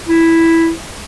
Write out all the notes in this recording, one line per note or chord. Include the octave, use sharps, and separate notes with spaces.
E4